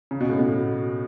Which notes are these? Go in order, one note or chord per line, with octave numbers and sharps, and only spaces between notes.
C#3
B2
A2
B2